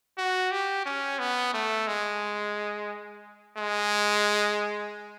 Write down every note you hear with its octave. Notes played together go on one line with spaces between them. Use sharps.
F#4
G4
C#4
B3
A3
G#3
G#3